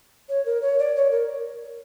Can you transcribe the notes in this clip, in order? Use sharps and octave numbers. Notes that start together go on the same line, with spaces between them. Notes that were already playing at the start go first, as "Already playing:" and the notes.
C#5
A#4
C#5
D5
C#5
A#4